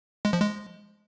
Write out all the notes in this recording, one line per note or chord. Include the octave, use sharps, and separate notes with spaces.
G#3
F3
G#3